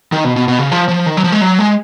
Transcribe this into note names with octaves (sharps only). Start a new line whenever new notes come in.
D#3
B2
B2
B2
C#3
F3
F3
D#3
F#3
F3
G#3
F#3
G#3